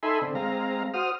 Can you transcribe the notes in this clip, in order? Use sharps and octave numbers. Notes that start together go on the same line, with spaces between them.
D#4 A4 E5 G#5 B5 C6
D3 C4
G#3 C4 F5 A#5
F#4 C5 D#6 F6